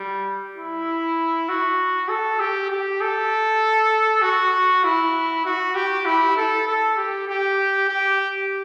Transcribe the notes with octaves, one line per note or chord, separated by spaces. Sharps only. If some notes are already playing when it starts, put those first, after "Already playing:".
Already playing: G3
E4
F#4
A4
G4
G4
A4
F#4
E4
F#4
G4
E4
A4
A4
G4
G4
G4